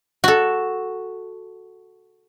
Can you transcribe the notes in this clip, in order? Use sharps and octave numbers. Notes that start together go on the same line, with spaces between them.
F#4 A4